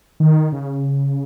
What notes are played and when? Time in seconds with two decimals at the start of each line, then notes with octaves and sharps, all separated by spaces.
0.20 D#3
0.52 C#3